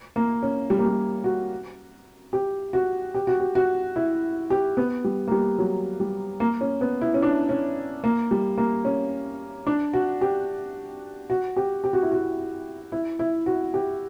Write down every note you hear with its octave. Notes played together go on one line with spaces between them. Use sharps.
A#3
C#4
G3
A#3
G3
F#4
G4
F#4
G4
F#4
G4
F#4
E4
G4
B3
G3
A#3
G3
F#3
G3
A#3
C#4
B3
E4
C#4
D4
C#4
A#3
G3
A#3
C#4
D4
F#4
G4
F#4
G4
G4
F#4
E4
F#4
E4
E4
F#4
G4